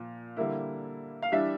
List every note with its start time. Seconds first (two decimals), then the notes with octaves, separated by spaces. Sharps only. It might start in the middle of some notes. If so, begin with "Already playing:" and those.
Already playing: A#2 F3
0.37 D3 G3 A#3 E4
1.22 F5
1.32 E3 G3 D4 E5